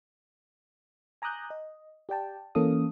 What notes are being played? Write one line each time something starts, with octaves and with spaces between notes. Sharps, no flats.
G#5 A#5 D6 D#6 F#6 G6
D#5
G4 D5 G5 A5
E3 A#3 C#4 A4 F5 D#6